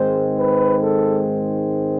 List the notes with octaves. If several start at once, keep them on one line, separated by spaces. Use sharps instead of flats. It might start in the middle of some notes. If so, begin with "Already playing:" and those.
Already playing: G#2 D#3 G#3 C4 C5
B4
A4